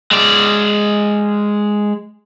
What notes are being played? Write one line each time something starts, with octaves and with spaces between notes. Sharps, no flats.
G#3 D5